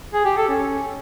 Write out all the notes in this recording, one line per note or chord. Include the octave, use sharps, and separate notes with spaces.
G#4
G4
A4
C#4